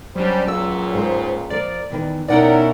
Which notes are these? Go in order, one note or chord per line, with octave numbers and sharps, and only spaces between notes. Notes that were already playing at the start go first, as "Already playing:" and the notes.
F#3 G3 C#4 D4 C5
C#2 A#2 F#3 F#4 E6
G#2 G#4 C5
F3 A#4 D5
E2 D#3 E3
B2 C#4 D#4 E4 A#4 D5 F#5 G5